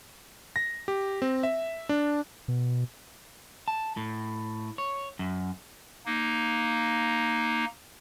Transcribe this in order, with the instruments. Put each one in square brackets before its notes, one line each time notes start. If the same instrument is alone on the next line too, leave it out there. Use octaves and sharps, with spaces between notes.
[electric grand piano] A#6
G4
C4
E5
D4
[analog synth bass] B2
[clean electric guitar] A5
A2
C#5
F#2
[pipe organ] A#3 D#4